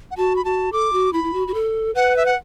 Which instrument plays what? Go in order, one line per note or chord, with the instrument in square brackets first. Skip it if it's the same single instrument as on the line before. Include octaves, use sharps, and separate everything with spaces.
[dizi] F#5
[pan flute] F#4 [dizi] A5
[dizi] B5
[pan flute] F#4 [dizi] A5
[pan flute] A4 [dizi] D6
[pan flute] F#4
[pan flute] E4 [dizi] B5
[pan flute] E4
F#4
F#4
A4
[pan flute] B4 [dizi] F#5
[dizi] E5
F#5